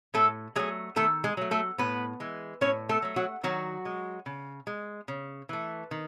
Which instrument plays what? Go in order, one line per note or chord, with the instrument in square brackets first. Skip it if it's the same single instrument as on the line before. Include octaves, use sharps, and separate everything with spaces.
[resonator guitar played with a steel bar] A2 A3 A4
F#3 G#3 A3 G#4
D#3 A3 A4
G#3 G#4
F#3 A3
A3 A4
A2 B3 B4
E3 G#3
A2 C#4 C#5
A3 A4
F#3 A3
F#3 F#4
D#3 F#3 F#4
G#3
C#3
G#3
C#3
E3 A3
D#3